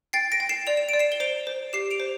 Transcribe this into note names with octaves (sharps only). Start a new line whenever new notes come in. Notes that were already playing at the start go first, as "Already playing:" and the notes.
G5 A6 C7
A#6 D7
G5
C7 E7
D5 F7
E7
D5 D7
C7 E7
G7
C5 D7 F7
C5
G4 C7 E7
D7 F7
C5